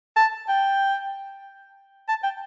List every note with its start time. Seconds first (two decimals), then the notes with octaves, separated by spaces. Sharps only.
0.16 A5
0.49 G5
2.09 A5
2.23 G5